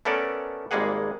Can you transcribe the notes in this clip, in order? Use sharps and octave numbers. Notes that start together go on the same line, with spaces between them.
A3 B3 C#4 A4 A#4 D5
G#1 G3 G#3 A#3 G#4 F#5